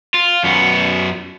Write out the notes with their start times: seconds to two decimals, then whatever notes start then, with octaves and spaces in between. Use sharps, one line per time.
0.14 F4
0.44 F#2 B3